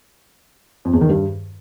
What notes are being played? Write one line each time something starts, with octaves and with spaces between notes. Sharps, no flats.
F2
E2
D#3
G2